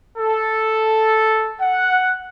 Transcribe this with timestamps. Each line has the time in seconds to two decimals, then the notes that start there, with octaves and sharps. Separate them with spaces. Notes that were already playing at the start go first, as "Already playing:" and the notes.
0.18 A4
1.60 F#5